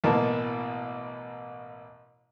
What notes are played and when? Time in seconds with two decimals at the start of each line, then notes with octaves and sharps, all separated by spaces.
0.04 A1 B2 A#3 A5